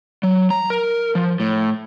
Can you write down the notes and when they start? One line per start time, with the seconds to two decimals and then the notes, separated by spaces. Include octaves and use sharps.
0.23 F#3
0.50 A#5
0.70 A#4
1.15 F3
1.40 A2